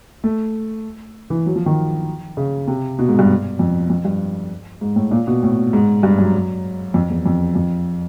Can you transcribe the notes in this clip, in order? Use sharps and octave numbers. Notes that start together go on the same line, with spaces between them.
A3
E3
F#3
F3
D#3
C#3
C3
B2
G#2
G2
F2
F2
G2
G#2
A2
A#2
B2
A2
G#2
G2
F#2
F2
E2
F2
F2